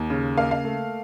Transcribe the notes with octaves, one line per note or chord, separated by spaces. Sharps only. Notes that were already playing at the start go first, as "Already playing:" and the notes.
Already playing: D#2
C#3
A#3 F5
F5
A3